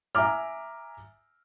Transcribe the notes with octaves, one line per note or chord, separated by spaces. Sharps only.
E5 G#5 A#5 D6 F6